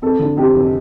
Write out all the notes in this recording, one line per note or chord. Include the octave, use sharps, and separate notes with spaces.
F2 A4
D3
F2 G4
F1